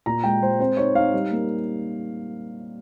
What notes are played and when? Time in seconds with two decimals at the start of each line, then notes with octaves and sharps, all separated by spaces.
0.06 A#2 A#5
0.24 G#3 G5
0.42 G#3 C5
0.60 C4 C5
0.77 D#4 C#5
0.95 D#4 F5
1.14 G3
1.31 A#3